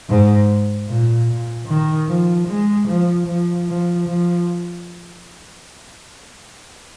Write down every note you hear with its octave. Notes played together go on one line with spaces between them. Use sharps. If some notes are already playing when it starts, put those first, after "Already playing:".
G#2
A#2
A#2
D#3
F3
G#3
F3
F3
F3
F3